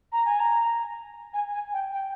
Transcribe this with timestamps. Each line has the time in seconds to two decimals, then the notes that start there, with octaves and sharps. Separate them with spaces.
0.12 A#5
0.25 G#5
0.40 A#5
1.34 G#5
1.53 G#5
1.73 G5
1.93 G5